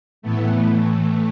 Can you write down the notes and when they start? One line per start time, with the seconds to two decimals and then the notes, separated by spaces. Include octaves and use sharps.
0.22 A2 E3 A3 B3